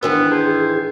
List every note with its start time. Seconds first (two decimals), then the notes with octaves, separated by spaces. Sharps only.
0.03 G#2 D#3 E3 B3 D4 F#4 A#4
0.32 G#4 C5 A5 G#6